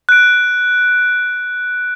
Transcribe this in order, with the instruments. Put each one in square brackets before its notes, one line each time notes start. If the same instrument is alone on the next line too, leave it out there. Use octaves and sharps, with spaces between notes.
[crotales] F#6 D7